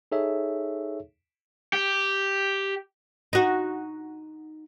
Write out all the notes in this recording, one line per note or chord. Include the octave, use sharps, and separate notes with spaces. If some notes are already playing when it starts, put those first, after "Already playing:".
D#4 G#4 A4 C#5 E5
G4
D#4 F#4